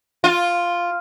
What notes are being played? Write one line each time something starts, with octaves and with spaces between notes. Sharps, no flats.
F4